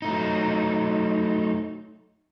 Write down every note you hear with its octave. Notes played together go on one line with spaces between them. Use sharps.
F#3 A3 D#4